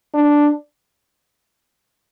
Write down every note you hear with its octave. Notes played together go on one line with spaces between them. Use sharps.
D4